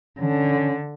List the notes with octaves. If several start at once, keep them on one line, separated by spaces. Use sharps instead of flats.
D3 C#4